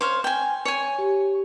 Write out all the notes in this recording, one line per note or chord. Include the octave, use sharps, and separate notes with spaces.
C5 C#5 F5
G5 G#5
C#5 G#5
G4